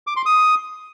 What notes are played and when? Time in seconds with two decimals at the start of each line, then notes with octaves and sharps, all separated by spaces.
0.07 D6
0.16 C6
0.26 D#6